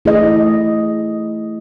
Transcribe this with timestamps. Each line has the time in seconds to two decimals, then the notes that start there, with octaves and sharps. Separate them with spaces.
0.05 A3 E4 G#4 D#5